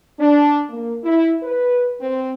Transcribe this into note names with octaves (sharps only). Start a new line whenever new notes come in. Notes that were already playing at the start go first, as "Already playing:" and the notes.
D4
A#3
E4
B4
C4